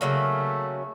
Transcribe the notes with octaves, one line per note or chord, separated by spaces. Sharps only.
C#3 F#3 A3 A#3